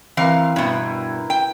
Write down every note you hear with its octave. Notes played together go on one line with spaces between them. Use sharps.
E3 C4 A#4 B4 F5
G2 B2 E4
G5